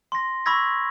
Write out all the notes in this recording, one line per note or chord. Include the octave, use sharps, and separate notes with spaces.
C6 A#6
B5 C#6 E6 G#6 A#6 B6